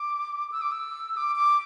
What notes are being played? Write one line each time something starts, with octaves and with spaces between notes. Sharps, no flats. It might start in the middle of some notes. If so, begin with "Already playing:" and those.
Already playing: D6
E6
D6
E6
D6
D6